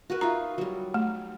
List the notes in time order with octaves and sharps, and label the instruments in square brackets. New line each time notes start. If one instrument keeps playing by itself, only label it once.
[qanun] F#4 A#4 B4
[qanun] D#4 F4 E5 [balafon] A#5
[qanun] F#3 G3
[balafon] A3